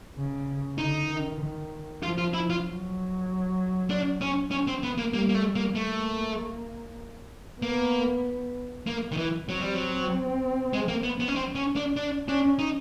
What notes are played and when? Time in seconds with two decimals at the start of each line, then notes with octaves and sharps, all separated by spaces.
0.17 C#3
0.78 D3 D#4
1.10 D#3
1.41 D#3
2.03 F3 F4
2.18 F4
2.34 E4
2.50 F4
2.65 F#3
3.90 D4
4.21 C#4
4.51 C#4
4.67 C4
4.83 B3
4.98 A#3
5.13 G3 A#3
5.29 A#3
5.35 A3
5.56 A#3
5.75 A3 A#3
7.62 A#3 B3
8.87 A#3
9.12 D#3
9.17 E3
9.48 F#3 C4
9.61 G3
9.74 F#3
10.73 G#3
10.88 A#3
11.03 B3
11.20 B3
11.28 C#4
11.35 C4
11.55 C#4
11.76 D4
11.96 D4
12.27 C#4 D4
12.59 D#4